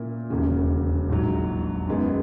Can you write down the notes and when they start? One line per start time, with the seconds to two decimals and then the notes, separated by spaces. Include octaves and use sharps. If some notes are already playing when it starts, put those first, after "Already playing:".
Already playing: A#2 A#3 C#4 E4
0.30 E1 D#2 C#3
1.09 A#1 G#2 F#3
1.87 F#2 D#3 G#3 B3